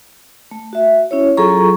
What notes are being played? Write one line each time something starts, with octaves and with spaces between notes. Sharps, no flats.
A3
F#4 E5
C#4 E4 C#5
F#3 F4 G#4 A4 A#5 C#6